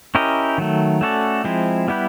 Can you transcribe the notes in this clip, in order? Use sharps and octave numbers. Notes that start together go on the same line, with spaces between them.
C#4 E4 G4 A#4 D#5
D#3 F#3 A3
A3 C#4 F#4 A4 D5
F3 G#3 C4 E4
G3 B3 E4 G4 B4